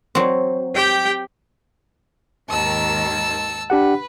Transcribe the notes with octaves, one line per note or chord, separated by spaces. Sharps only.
F#3 C4
G4 G5
D#2 G#2 D#3 A5 E6
D4 G4 B4 F#5